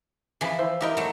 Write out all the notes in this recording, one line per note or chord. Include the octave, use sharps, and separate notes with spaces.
E3 F3 G#4 A5 B5
E4 C5
D#4 E4 G4 A#4 D#5 G5
F#3 A3